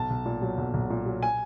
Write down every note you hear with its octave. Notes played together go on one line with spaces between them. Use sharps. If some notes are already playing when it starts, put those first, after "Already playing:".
Already playing: B1 A5
B1
A#2
F#3
B1
B1
A#2
F#3
G#5